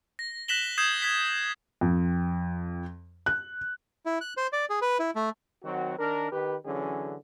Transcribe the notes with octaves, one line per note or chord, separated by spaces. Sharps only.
A#6
F#6 A#6 B6 E7 F#7 G7
D#6 G6 G#6 C7 E7
G#6 B6
F2
F#6
E4
F#6
C5
D5
G#4
B4
E4
A3
D#3 F#3 C4 F#4
D#3 D4 A#4
D#3 G4 B4
D3 E3 F#3 C#4 G#4